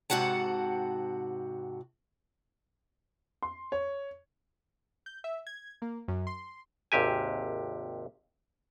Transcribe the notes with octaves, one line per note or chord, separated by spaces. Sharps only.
G#2 C3 F#4 F#5 A5
C6
C#5
G6
E5
G#6
A#3
F#2
C6
G#1 D#2 C3 G4 G#5